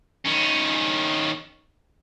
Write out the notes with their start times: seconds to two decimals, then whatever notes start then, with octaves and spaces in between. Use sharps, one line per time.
0.25 D#3 C#4